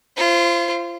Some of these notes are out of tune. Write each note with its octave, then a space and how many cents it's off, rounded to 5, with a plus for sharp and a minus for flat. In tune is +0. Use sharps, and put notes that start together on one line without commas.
F4 -30 C5 +10